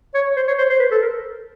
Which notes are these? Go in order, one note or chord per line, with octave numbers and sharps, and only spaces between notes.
C#5
C5
C#5
C5
C5
B4
A4
A#4